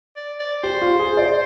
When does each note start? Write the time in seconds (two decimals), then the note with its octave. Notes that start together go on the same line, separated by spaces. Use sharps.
0.16 D5
0.39 D5
0.63 G4 C5
0.81 F4
0.99 G#4
1.17 D5